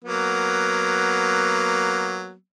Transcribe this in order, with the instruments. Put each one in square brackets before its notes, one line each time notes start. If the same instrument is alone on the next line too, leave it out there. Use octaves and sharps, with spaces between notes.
[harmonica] F#3 A#3 B3